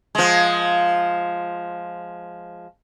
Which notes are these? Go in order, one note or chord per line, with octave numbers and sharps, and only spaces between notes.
F3 G#3